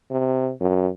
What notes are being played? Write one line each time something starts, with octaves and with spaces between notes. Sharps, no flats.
C3
F#2